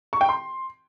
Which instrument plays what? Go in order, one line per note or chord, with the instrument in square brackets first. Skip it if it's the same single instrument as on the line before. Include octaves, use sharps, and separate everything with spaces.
[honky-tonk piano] C#6
G5
C6